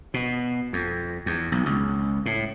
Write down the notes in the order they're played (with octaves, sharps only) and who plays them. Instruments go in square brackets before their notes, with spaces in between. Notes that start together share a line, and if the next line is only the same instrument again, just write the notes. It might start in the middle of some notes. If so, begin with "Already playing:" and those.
[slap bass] B2
F2
E2
B1
C#2
A2